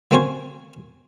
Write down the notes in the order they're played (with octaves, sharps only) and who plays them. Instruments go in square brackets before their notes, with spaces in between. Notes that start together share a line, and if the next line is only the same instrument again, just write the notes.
[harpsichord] F#3 A#3 C4 C#4 C5 C#5